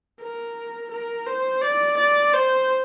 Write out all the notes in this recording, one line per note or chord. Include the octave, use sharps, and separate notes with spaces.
A#4
A#4
C5
D5
D5
C5